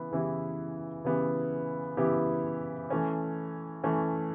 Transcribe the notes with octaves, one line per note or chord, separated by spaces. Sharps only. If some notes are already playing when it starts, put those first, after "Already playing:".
Already playing: C#3 E3 B3 E4
C#3 E3 B3 E4 G4
C#3 E3 B3 E4 G4
C#3 E3 B3 E4 G4
E3 A3 C#4
E3 A3 C#4